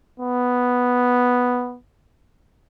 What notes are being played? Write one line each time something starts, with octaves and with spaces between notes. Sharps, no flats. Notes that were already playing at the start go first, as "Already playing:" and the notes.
B3